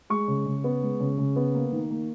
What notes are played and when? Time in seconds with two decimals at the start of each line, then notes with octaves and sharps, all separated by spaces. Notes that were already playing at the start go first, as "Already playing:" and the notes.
0.10 G#3 C#6
0.28 C#3
0.46 C#3
0.64 B3
0.82 G#3
1.00 C#3
1.18 C#3
1.36 B3
1.55 A#3
1.72 D#3
1.90 A#3